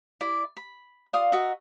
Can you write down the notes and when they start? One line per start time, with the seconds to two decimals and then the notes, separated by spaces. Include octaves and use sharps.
0.21 E4 D5
0.57 B5
1.13 F4 D5 F5 D#6
1.32 F#4 A#4 D#5 E5